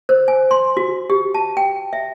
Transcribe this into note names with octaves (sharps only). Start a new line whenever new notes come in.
C5
G#5
C6
F#4
G4
A5
G5
E5